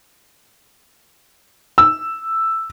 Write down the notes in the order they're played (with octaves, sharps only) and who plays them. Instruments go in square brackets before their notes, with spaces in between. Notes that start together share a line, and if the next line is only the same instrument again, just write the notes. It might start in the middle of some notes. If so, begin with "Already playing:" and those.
[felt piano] E6